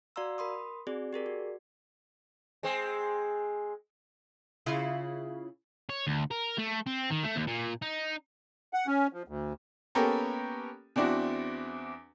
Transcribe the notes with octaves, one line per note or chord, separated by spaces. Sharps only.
F#4 D5 F5 A#5 C6 E6
A#4 B5 C6 D#6
C4 F#4 G#4 D5
G4 G#4 A#4 D5
F#4
G#3 C4
C#3 E4 F4
C#5
D2
A#4
A3
C4
D#3
A3
D#2
A#2
D#4
F#5
C#4
F3
D2
A#3 B3 C#4 G4 A4 A#4
E2 C4 D4 E4 F#4